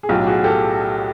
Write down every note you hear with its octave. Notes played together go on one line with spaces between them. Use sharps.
G#4
B1 A2 F#3 F4 G4
F#4 G#4
G4 A4